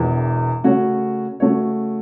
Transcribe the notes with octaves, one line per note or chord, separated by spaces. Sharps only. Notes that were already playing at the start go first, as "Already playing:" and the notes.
Already playing: E1 E2 E3
C#3 A3 F#4 C#5
C#3 A3 F#4 C#5